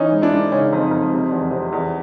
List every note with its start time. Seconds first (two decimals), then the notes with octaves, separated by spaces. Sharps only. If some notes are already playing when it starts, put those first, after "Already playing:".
Already playing: E3 C#4 D#4
0.12 G#2
0.22 D4 E4
0.33 G#2
0.52 C#3 C#4 D#4
0.73 F2
0.92 F2
1.12 C3
1.31 E2
1.51 C3
1.72 E2